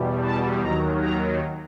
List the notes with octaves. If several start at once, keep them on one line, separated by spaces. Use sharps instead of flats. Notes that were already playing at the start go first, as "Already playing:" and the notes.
Already playing: E2 B2 G3
A5
D#2 D#3 F#3 A#5
A#5